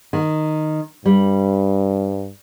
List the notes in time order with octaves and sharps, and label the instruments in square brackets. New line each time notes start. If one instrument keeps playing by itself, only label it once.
[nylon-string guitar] D#3
[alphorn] G2 [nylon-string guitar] G3